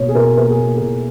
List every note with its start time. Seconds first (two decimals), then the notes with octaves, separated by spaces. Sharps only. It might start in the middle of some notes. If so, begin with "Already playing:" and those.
Already playing: B2 A#3 C#5
0.09 G#4
0.15 B2 A#4
0.37 A#3 A#4
0.50 G#4
0.59 A#3
0.76 B2 G#4